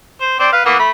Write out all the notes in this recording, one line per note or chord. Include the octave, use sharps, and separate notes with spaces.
C5
C4 C5 D5
B4 F5
E3 A#3 B3
A3 B5